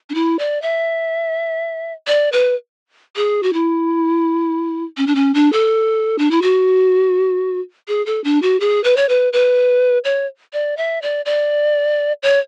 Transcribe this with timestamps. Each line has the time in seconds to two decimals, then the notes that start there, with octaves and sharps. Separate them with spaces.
0.10 D4
0.15 E4
0.39 D5
0.62 E5
2.07 D5
2.32 B4
3.16 G#4
3.43 F#4
3.53 E4
4.97 C#4
5.07 D4
5.15 C#4
5.34 D4
5.53 A4
6.18 D4
6.31 E4
6.42 F#4
7.88 G#4
8.06 A4
8.24 D4
8.42 F#4
8.60 G#4
8.84 B4
8.97 C#5
9.09 B4
9.33 B4
10.04 C#5
10.53 D5
10.77 E5
11.02 D5
11.25 D5
12.23 C#5